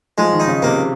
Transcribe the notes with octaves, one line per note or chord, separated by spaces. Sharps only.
F3 G#3
D#3
D#4
C#3
C3 A#3